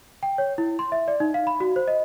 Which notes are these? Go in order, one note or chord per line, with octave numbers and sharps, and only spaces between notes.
G5
C#5
E4
C6
E5
D5
D#4
F5
B5
F#4
C5
D#5